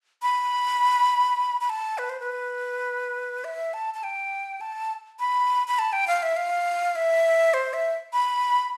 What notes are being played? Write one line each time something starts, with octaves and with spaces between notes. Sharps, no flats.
B5
B5
A5
B4
C5
B4
E5
A5
A5
G5
A5
B5
B5
A5
G5
F5
E5
F5
E5
C5
E5
B5